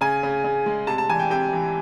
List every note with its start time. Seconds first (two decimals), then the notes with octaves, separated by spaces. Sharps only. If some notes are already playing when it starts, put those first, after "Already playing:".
0.01 C#3 G#5
0.23 C#3
0.44 C#3
0.66 G#3
0.87 C3 A5
0.98 A5
1.09 E3 G#5
1.19 G5
1.30 C3 G5
1.53 E3